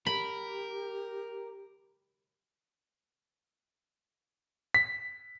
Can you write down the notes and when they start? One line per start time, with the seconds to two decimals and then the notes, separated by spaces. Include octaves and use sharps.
0.06 G4 A#4 B5
4.75 B6